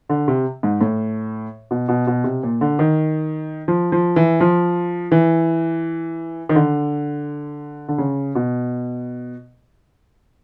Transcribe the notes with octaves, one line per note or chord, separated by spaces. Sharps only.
D3
C3
G#2
A2
B2
B2
B2
C3
A#2
D3
D#3
F3
F3
E3
F3
E3
D#3
D3
D3
C#3
B2